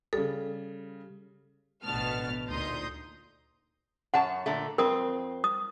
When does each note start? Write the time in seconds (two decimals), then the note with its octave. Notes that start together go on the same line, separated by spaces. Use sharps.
0.13 C#3 G3 A4
1.84 A1 D2 B2 B3 A5 F6
2.49 D2 A#2 D#4 C6 D#6 G6
4.14 F#2 C#5 F#5 A5
4.46 A#2 D3 A3
4.78 F2 C4 A#4 D#6
5.44 D#6